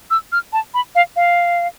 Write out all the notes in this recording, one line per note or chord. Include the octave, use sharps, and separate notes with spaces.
E6
F6
A5
B5
F5
F5